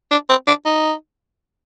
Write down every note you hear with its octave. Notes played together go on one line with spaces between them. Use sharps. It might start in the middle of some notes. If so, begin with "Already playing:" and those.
D4
C4
D4
D#4